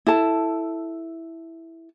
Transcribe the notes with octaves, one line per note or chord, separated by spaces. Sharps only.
E4 A4 A5